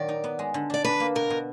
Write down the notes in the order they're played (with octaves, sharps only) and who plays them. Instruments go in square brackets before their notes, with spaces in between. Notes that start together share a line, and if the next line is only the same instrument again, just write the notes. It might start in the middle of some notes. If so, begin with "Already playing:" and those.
Already playing: [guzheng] A#2 D#3 F#3 A#3 [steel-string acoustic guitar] D5
[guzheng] D#4
B3
G#3
D3
[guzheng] D4 [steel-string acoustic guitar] D5
[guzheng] D4 [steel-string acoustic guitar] B4
[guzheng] A#3
[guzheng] B2 [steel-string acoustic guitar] A#4
[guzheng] B2